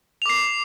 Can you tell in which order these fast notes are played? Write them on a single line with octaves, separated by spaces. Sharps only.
F7 D6 C7